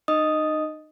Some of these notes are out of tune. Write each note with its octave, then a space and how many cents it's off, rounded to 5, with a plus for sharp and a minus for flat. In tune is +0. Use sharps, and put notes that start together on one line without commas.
D#4 -35 D#5 +0 D#6 +0